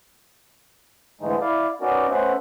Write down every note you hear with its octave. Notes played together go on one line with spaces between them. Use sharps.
G#2 D3 E3 G#3 A3 D#4
E4 D5 F5
B3 C#4 D#4 F#4 A#4 D5
A3 B3 C#4 C5 E5 F#5